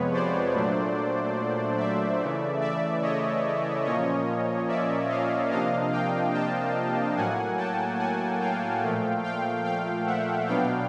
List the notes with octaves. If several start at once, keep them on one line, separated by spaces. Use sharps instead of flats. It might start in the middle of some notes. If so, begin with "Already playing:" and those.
Already playing: F2 C3 F3 G#3 B3 B4 C#5
C5 D5
A#2 F#3 A3 D4
D5 E5
C#3 E3 A3
D5 E5
C#5 D#5
A#2 F3 A#3 C#4 C#5 D#5
D5 E5
D#5 F5
C3 F3 A#3 D4 D#5 F5
F5 G5
G5 A5
A2 F#3 A#3 F#5 G#5
G5 A5
F#5 G#5
F5 G5
A#2 F3 A3
F5 G5
F5 G5
E5 F#5
B2 F#3 B3 D4 F5 G5